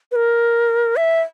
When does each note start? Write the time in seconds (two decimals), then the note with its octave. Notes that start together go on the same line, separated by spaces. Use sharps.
0.12 B4
0.16 A#4
0.96 E5